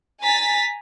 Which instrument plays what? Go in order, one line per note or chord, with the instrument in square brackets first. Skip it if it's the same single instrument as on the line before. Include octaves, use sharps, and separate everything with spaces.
[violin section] G#5 A#5 A6 B6